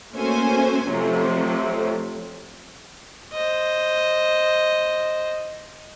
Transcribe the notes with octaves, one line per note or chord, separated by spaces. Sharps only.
A3 A#3 C#4 F#4 C5 G#5
F2 C3 F3 F#3 A3
C5 D#5